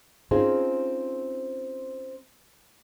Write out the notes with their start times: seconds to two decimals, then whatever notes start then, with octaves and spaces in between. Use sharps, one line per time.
0.31 C4 C#4 D#4 F4 G#4 C5